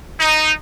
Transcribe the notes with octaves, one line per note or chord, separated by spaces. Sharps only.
D#4